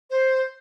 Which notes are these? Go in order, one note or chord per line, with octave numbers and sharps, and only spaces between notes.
C5